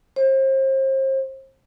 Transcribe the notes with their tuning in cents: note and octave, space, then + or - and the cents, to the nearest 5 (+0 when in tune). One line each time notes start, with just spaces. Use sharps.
C5 +35